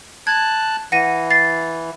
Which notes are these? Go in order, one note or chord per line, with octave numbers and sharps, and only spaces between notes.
A5 F#6 G#6
E3 F#5 A#6 D#7
A6 C7